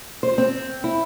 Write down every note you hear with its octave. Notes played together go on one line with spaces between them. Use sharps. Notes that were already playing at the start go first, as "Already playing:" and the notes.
C5
C4
E4